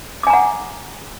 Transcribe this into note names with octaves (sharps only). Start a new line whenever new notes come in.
F#5 G#5 A#5 D6